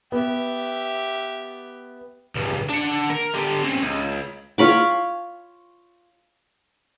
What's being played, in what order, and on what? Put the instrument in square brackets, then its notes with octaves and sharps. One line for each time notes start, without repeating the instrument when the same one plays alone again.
[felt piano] B3 [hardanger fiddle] G4 E5
[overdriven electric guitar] C#2 G2
D4 F#5
A#4
D3 G4
C4 C#4
C#2
[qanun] F4 C#5 B5 D6